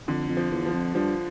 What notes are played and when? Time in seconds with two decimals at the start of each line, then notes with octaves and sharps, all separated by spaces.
0.08 F2 D3
0.29 F2
0.37 F3
0.51 E2
0.66 F3
0.74 F2
0.95 G2 F3